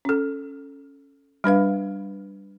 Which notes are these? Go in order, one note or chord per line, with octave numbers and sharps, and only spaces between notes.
C#4 A4
G3 D4 B4 F5